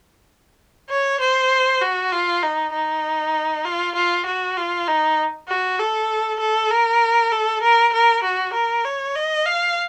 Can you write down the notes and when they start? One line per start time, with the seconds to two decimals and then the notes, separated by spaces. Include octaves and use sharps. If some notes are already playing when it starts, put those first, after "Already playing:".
0.90 C#5
1.21 C5
1.82 F#4
2.13 F4
2.43 D#4
2.73 D#4
3.65 F4
3.96 F4
4.26 F#4
4.57 F4
4.88 D#4
5.49 F#4
5.79 A4
6.40 A4
6.71 A#4
7.32 A4
7.62 A#4
7.93 A#4
8.24 F#4
8.54 A#4
8.85 C#5
9.16 D#5
9.46 F5